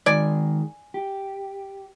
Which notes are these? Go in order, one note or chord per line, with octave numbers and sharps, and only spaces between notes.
D#3 G#3 D5 G#5
G4